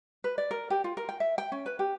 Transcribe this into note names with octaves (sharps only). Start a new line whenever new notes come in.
B4
D5
A#4
G4
F4
A#4
G5
E5
G5
C#4
B4
G4